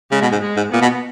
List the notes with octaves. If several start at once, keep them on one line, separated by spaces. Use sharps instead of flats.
C#3 G#3
B2
G#2
G#3
G#2
A#2 B3
B2